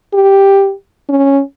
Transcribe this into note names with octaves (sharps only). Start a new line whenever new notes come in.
G4
C#4